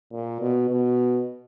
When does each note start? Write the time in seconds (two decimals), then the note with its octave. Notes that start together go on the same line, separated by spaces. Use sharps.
0.12 A#2
0.41 B2
0.69 B2